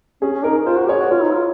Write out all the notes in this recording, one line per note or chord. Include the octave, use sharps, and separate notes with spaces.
C#4 G#4
C#4
D#4 A#4
F4 C5
F#4
G#4 C#5
F#4
F4 C#5
D#4
F4